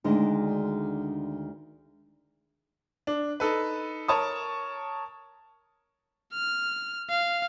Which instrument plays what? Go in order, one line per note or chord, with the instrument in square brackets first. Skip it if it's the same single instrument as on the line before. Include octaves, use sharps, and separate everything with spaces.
[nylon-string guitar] D2 D#3 G#3 D4 D#5
[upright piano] D4
D#4 A4 B4
A#4 C#5 A5 D#6
[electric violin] F6
F5